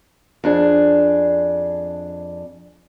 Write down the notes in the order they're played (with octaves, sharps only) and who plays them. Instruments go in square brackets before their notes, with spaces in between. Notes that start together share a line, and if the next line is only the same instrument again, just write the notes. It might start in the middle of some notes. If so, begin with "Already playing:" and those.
[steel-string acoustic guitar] F2 D4 G#4